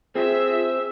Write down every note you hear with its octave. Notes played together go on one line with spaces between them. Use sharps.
C4 F4 G#4 E5